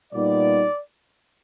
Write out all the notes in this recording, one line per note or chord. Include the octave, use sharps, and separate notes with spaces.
A#2 G3 B3 D#4 D5